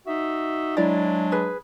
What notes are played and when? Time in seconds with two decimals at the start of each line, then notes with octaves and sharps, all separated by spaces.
0.06 D#4 F#4 E5
0.76 F#3 G#3 D4 E4 D5 A#5
1.32 G#4 B4